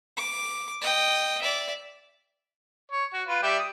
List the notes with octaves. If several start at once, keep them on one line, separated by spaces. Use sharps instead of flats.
D6
D#5 G5
D5 E5
C#5
F#4
F4 B4
G3 G4 E5
D#6